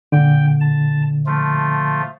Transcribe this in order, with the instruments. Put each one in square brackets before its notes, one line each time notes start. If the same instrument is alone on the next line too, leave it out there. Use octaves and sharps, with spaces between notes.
[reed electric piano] A#2 D3 [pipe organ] G5
[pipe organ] A5
F3 A3 F4